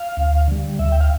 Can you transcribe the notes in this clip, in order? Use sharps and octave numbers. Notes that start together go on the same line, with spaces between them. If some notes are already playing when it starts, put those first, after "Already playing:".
Already playing: F5
D2
D3 G3
D2 E5
G5
F5